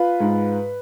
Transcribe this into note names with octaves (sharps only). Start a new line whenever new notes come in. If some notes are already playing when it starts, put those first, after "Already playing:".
Already playing: F4 B4
G#2